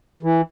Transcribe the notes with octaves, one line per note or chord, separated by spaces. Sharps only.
E3